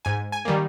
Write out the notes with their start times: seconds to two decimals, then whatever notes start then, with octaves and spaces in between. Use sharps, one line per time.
0.05 G#2 G#5
0.32 G#5
0.45 D#3 G3 A#3